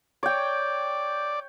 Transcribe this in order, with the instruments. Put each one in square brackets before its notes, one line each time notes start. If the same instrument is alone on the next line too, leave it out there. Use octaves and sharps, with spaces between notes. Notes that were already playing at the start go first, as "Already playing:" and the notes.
[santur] C#5 G5 [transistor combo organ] D5